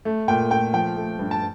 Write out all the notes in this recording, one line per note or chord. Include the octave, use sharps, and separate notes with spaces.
A3
A#2 G5
A3 G5
F3 G5
A3
G2
A5